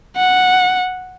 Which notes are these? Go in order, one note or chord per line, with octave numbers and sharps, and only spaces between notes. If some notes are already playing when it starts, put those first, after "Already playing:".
F#5